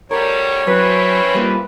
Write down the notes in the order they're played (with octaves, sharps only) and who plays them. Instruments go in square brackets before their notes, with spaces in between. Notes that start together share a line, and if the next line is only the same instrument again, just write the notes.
[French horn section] D2 G3 [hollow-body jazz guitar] A#4 [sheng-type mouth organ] C#5
[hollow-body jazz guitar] F#3 [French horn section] C4 C#4 E4 [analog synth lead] B4
[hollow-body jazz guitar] G3 A#3 F4